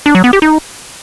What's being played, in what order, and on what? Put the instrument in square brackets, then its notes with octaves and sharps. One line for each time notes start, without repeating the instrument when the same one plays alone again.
[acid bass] D4
F#3
B3
G4
D#4